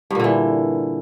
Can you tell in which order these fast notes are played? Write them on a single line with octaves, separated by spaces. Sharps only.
G2 A#2 D3 E3